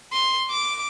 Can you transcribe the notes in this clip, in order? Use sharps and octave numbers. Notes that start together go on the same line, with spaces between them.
C6
D6